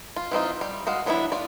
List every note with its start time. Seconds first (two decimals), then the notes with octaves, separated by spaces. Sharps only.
0.16 F4
0.31 E3 C4 D#4 F4
0.61 G3
0.87 G#3 F#4 F5
1.06 E3 F#3 B3 D4 E4
1.32 F4 D5